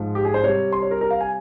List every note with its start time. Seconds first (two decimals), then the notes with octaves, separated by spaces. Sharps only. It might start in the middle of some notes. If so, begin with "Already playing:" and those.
Already playing: G#2 F3 G#3
0.15 G4
0.25 G#4
0.34 C5
0.43 C3 G3 C#5
0.72 C6
0.82 C#5
0.91 A#4
1.01 A#4
1.11 F5
1.21 G#5